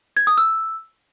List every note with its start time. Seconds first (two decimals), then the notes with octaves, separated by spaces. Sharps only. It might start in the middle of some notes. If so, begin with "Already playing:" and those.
0.17 G#6
0.27 D#6
0.38 E6